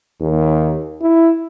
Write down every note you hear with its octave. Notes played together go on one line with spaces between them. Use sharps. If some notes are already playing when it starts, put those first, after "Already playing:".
D#2
E4